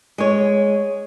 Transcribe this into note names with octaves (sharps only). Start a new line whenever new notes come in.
G#3 C#5